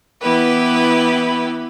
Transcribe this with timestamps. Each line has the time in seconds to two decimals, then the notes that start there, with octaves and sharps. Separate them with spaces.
0.21 E3 B3 E4 G4 B4